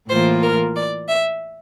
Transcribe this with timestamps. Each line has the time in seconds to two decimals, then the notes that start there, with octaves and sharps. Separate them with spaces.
0.09 A2 E3 A#3 F4 C5
0.42 A#4
0.76 D5
1.08 E5